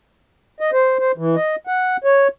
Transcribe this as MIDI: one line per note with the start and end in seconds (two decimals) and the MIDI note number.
0.60 0.71 75
0.73 0.99 72
0.99 1.12 72
1.18 1.36 52
1.36 1.56 75
1.67 1.97 78
2.04 2.28 73